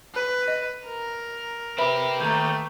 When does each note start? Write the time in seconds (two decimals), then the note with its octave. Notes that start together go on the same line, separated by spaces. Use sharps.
0.14 B4
0.48 D#5
0.86 A#4
1.78 C4 G4 B4 E5 B5
2.20 D#2 A3 A#5 G6